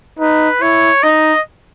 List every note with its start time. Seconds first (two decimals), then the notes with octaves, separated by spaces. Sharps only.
0.19 D#4 B4
0.61 E4 C#5
1.03 D#4 D#5